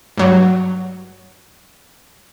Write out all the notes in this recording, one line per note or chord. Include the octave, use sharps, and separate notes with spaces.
G2 F#3